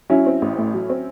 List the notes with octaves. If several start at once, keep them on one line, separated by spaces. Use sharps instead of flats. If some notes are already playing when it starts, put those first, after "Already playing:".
F#3 C#4 E4
C4
A1
A2
F#3
C4